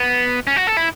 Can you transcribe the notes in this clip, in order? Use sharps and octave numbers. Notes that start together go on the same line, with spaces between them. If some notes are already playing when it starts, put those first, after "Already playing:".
Already playing: B3
C#4
F#4
A4
E4